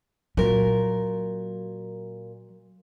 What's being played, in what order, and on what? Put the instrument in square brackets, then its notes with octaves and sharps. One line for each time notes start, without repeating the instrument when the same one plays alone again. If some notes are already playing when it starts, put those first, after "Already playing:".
[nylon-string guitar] A#2 A#4 [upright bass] F#3